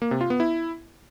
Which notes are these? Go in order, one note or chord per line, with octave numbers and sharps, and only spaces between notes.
A#3
C3
F4
B3
E4